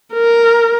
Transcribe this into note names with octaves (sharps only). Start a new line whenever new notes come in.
A#4